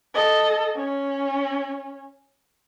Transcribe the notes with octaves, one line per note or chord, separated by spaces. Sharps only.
A4 D#5
C#4